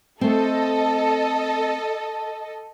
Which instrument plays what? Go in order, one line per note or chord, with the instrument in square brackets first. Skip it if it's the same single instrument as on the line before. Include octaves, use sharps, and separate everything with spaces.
[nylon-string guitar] A3 C4 [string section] A4 D#5